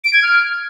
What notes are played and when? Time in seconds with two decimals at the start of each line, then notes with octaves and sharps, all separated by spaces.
0.04 D7
0.14 G#6
0.23 F6